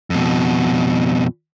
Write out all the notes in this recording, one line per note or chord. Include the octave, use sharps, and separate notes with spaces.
F2 B2